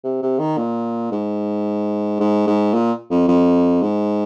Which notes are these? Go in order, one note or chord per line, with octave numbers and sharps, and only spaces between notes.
C3
C3
D#3
A#2
G#2
G#2
G#2
A#2
F2
F2
G#2